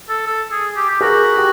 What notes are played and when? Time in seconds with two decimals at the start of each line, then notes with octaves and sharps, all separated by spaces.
0.09 A4
0.27 A4
0.52 G#4
0.76 G4
0.91 G4
1.01 F#4 G#4 A#4
1.37 G4